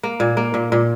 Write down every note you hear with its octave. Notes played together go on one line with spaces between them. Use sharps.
A#3
A#2
A#3
A#2
A#2